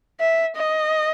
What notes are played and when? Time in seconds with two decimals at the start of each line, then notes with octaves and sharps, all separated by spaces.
0.20 E5
0.56 D#5